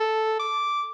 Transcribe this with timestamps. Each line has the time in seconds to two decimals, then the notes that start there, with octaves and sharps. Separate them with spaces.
0.01 A4
0.40 D6